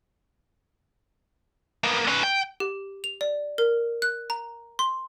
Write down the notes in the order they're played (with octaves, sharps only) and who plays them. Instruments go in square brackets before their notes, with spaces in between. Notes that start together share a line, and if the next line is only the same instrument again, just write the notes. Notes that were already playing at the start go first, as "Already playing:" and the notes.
[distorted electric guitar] A#3 B3
C#4 B4
G5
[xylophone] G4
F7
D5
A#4
F#6
A#5
C6